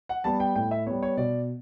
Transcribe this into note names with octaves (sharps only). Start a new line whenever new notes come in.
F#5
G3 B3 A5
G5
A2 G5
E5
G3 B3 C#5
C#5
B2 D5